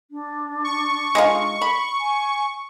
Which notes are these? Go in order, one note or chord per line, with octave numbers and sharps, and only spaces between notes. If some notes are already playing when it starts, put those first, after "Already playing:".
D4
C#6
G#3 D#4 F4
B5
G#5